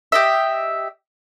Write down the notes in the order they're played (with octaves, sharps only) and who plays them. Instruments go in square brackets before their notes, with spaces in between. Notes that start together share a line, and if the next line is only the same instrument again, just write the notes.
[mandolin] G4 D#5 E5